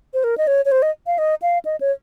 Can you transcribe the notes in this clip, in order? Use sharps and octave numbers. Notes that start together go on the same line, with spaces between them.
C5
A#4
D#5
C#5
C#5
C5
D#5
F5
D#5
F5
D#5
C#5